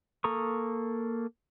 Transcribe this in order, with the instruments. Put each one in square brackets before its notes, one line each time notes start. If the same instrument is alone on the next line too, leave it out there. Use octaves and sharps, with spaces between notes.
[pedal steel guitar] A#3 A4 A#5 C#6 D#6